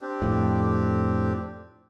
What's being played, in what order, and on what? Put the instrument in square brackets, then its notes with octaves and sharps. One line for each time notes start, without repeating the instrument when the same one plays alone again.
[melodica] C4 D4 G4
[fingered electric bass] F2 A2